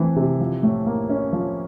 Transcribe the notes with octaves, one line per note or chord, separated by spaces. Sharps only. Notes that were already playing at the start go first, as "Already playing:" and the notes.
Already playing: E3 A3 C4
C3
F3
A2
A#3
C#4
F3